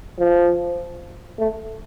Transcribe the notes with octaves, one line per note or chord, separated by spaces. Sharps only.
F3
A3